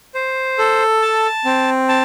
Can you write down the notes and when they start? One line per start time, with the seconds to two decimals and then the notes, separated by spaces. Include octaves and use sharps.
0.15 C5
0.59 A4
1.02 A5
1.45 C4
1.89 A5